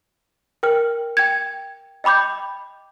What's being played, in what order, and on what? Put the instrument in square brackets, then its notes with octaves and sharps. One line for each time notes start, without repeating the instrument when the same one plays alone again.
[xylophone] A#4 G5 F6
G5 G#6
D#5 G5 B5 D6 G6